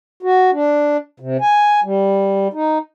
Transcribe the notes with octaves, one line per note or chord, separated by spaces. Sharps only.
F#4
D4
C3
G#5
G3
D#4